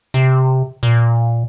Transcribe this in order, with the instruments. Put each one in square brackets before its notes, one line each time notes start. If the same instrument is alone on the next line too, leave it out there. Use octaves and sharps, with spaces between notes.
[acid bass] C3
A#2